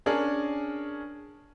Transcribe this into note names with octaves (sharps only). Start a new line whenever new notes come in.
C#4 D4 G#4 A#4